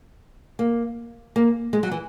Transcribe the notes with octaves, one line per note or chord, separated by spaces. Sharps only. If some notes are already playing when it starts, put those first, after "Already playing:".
A#3
A#3
G#3
F#3
E3